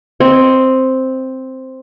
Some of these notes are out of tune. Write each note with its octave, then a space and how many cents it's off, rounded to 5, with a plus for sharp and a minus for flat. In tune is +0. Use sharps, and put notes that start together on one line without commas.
C4 +0 D#5 +0 C#6 +0